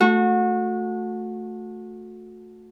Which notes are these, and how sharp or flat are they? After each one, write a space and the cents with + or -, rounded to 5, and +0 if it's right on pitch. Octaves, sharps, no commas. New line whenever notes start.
A3 +0 F#4 -30